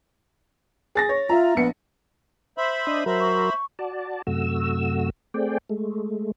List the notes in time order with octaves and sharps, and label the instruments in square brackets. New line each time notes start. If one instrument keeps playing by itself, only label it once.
[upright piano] G#4 A6 A#6
C#5
[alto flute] F4 [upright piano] E5 A#5
[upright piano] A#1 C#7 [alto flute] B3
[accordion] C5 E5 B5
[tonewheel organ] D4 D#5
[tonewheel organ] F#3 A#4 [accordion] C5 E5 B5
[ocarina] C#6
[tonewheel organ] F#4 D5 A5
F#2 C3 A3 F#4 E6
A3 C4 G#4 D5 G5
G#3 A3